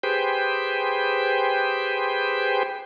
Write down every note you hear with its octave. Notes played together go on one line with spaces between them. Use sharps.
G4 G#4 B4 C5 G5